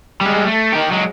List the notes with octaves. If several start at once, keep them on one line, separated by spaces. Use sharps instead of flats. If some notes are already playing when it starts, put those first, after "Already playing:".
G3 G#3
A3
D#3 G4
F#3 G#3